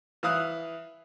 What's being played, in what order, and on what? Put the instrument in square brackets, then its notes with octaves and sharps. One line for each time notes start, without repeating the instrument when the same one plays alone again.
[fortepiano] E3 E5 F5 D#6 F#6